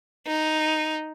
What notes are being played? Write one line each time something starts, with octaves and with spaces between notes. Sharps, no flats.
D#4